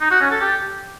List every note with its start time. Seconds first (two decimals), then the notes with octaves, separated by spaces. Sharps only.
0.01 D#4
0.11 F#4
0.21 C#4
0.31 A4
0.41 G4